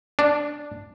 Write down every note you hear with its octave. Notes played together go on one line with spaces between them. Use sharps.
D4